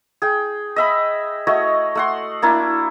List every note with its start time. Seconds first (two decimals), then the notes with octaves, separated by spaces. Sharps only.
0.22 G#4 G5
0.76 D#5 E5 B5
1.47 A3 F#4 C#5 D#5
1.95 A3 F#5 C6
2.42 A#3 D4 E4